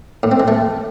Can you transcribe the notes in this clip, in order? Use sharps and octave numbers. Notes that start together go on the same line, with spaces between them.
A2
C4
G#3
A3